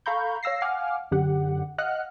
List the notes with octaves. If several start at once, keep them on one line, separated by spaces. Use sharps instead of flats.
A4 F5 A#5 B5 C#6 G6
C#5 F5 E6 A#6 C7
F5 F#5 G#5 D6 F6
F#2 D3 G4 F#5
D#5 F5 F#5 F6 F#6